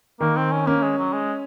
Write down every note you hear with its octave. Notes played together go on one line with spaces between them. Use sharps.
D#3 A#3
C4
C#4
A#3 C#4
G#3
F#3
G#3